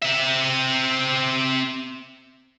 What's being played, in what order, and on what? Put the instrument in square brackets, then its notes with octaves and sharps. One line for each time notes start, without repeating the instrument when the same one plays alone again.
[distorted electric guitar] C4 E5